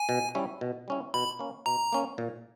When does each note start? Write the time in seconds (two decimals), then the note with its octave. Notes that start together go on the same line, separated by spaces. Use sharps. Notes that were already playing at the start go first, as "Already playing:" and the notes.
Already playing: G#5
0.09 B2
0.35 G3 C#4 E4
0.61 B2
0.88 G3 C#4 E4
1.14 B2 B5
1.39 A#3 C#4
1.66 B2 A#5
1.92 A#3 C#4
2.18 A#2